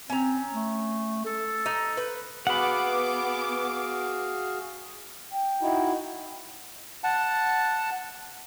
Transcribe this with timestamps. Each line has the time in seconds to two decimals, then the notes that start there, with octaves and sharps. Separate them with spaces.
0.10 C4 C#4 A#5
0.53 A3
1.25 A4
1.66 D#4
1.97 B4
2.47 B3 F#4 G#4 F5 F#5 B5 D6
5.31 G5
5.62 D#4 E4 F#4
7.04 F#5 A5